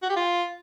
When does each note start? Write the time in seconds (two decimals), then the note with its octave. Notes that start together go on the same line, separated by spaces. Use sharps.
0.03 F#4
0.09 G4
0.16 F4